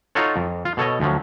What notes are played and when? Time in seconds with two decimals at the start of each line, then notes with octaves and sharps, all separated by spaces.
0.15 D#4 F4 F#4 A4 C#5
0.36 F2
0.65 F4
0.77 B2 A4 C#5 D#5
1.00 D2 F3 F#3